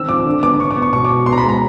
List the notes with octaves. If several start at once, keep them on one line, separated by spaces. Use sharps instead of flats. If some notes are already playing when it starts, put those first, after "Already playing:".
Already playing: D#3 C4 E6
F3 D6
D3
B3 D6
B3 C#6
D6
B3
C#6
B2 C#6
D6
B2
B3 C6
A#5
B5
G#3 A#5